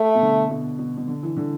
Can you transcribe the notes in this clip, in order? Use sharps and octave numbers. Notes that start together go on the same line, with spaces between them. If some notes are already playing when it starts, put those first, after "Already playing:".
Already playing: A3
B2
D3
B2
B2
B2
D3
E3
D3